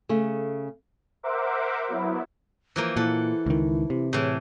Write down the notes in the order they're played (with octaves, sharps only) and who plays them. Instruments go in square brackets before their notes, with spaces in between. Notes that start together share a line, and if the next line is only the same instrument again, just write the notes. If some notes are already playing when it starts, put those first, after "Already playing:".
[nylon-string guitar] C#3 A3 G#4
[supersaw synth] A#4 C5 E5 F#5 D6
F#3 B3 E4
[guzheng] E3 F3 A#3
[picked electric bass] A#2 [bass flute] E4 [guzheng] A4 F#5
[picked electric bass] C#2 D#3
C3
[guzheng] A2 E3 [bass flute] G#4